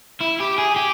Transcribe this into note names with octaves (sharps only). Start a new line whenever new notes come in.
E4
G4
G#4
G4